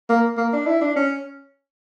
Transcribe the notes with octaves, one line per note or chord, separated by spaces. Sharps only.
A#3
A#3
D4
E4
D4
C#4